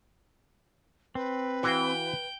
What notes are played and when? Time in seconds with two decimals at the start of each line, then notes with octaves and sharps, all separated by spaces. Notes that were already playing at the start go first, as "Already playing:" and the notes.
1.15 C4 B4
1.63 E3 F#4 F5 G5